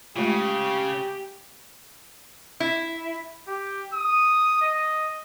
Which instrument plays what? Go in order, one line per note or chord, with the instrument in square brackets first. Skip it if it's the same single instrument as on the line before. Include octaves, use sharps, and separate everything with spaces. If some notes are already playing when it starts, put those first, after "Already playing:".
[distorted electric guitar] C#3 [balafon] G#3 A3 F4 [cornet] G4
[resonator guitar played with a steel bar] E4
[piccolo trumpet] G4
D#6
D#5